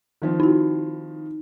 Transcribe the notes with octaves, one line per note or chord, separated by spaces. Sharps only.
D#3 F3 C4
D#4 E4 F#4